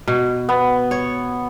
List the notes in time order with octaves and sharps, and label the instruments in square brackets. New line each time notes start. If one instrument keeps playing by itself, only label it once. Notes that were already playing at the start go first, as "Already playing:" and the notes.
[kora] B2
[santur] B3
[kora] C#5